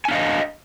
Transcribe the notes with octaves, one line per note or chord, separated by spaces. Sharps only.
D4 D#5 F5 G#5